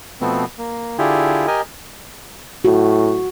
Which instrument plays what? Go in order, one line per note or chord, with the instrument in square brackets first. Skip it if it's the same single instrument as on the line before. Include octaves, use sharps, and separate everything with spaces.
[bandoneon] B2 F3 A3 B3 C4
A#3
D3 E4 F4 G4 G#4
G4 A#4 D#5 G#5
[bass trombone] A2 [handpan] F#4